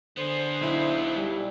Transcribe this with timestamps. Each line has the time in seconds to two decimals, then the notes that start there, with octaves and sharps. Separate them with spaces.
0.17 D3 B3 G#4 C5
0.61 B1 E4
1.16 G3